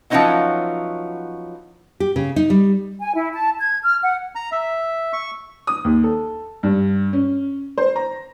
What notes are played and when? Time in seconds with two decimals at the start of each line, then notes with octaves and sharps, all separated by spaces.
0.10 F3 F#3 B3 C#4 D#4 E4
2.00 G4
2.16 C#3
2.36 D#4
2.50 G3
3.01 G#5
3.15 E4
3.33 A5
3.60 G#6
3.84 F6
4.03 F#5
4.35 A#5
4.52 E5
5.13 C#6
5.67 D#6
5.85 D#2
6.04 A4
6.63 G2
7.13 C#4
7.78 C5
7.96 A#5